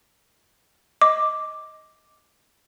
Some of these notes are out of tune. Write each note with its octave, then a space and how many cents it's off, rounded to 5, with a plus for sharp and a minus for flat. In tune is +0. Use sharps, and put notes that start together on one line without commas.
D#5 +15 D6 +0